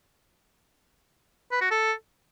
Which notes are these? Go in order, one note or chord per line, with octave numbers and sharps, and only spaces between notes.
B4
F#4
A4